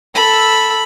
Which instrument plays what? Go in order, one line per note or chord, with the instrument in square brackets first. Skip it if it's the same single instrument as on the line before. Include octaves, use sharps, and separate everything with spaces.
[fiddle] A4 E6 [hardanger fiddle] B5